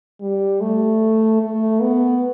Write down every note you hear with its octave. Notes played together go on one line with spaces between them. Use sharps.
G3
A3
A3
B3